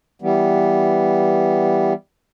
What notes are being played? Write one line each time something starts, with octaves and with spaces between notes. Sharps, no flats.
E3 G3 B3